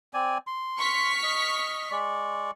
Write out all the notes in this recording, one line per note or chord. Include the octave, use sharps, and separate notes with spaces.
C4 D5 G#5
C6
C#6 F6 B6
D#5
G#3 D5 C#6